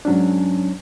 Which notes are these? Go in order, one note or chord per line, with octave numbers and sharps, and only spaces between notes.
G#2 F#3 C#4 D4